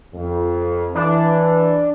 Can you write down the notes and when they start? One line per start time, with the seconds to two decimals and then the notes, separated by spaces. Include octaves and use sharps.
0.14 F2
0.95 E3 D4